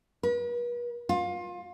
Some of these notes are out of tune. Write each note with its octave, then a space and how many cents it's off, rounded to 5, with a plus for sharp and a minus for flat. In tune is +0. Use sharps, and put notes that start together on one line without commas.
B4 -45
F4 +25